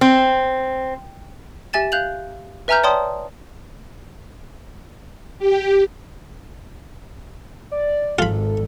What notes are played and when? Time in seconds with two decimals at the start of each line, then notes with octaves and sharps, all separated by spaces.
0.01 C4
1.73 G4 E5 G#5 A6 E7
1.92 F5 F#6 G6 F7 F#7
2.68 B4 E5 G#5 A#5 F6 G6
2.83 C#5 D5 G5 A5 C6 D#6
5.39 G4
7.71 D5
8.19 G#1 F4 A4 B5